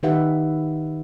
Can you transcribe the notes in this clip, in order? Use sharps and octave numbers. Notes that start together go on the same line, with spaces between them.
D#3 D#4 G4 B4 E5 F#5